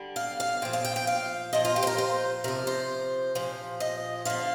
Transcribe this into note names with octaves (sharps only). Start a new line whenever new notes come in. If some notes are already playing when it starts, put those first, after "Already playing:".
Already playing: D3 G3
F5
F5
A#2 F3 G5
F5
G5
G5
F5
A#2 F3 D#5
F4
G4
C5
A#4
C5
C3 F3 A#4
C5
A#2 F3
D#5
D3 F3 F5